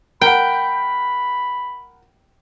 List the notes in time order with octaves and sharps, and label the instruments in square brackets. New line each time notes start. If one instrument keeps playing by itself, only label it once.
[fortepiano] A#4 F#5 [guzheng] G5 [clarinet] B5